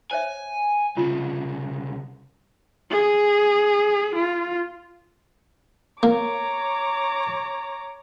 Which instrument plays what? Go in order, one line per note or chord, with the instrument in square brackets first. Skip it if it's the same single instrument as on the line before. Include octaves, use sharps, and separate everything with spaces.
[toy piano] C5 C#5 E5 [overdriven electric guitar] G#5
[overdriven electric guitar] C2 C#3 [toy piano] F4 C6
[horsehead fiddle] G#4
F4
[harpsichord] A#3 [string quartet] C#5 A#5 D6